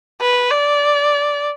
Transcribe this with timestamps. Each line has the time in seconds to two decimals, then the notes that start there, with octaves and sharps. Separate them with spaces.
0.21 B4
0.51 D5